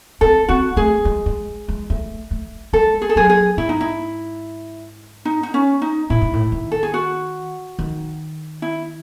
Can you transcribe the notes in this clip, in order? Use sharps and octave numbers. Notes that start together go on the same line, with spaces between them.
C4 A4
C4 F#4
A3 G#4
G#3
G#3
G#3
A3
A3
G#3 A4
G#4
A4
F#3 G#4
G#4
G#2 E4
D#4
E4
D#4
D#4
C#4
D#4
A2 E4
G#2
A2
D#3
A4
G#4
F#4
D#3
E4